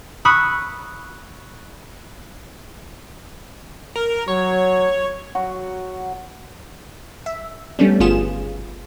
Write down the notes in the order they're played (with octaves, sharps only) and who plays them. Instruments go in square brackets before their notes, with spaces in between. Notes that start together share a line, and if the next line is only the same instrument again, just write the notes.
[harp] B5 C#6 D#6 E6 F#6
[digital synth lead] A#4
[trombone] F#3 [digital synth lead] C#5
[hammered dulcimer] F#3 F#4
[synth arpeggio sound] E5
G3 A3 B3 C#4 D4
G1 B3 F4 G#4 E7